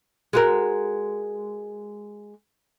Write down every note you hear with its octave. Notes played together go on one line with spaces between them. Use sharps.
G#3 F#4 A#4